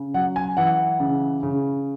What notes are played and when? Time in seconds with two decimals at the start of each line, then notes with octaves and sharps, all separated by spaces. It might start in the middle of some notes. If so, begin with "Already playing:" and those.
Already playing: C#3
0.14 F#3 F#5
0.36 G#5
0.57 E3 F#5
1.00 C#3
1.43 C#3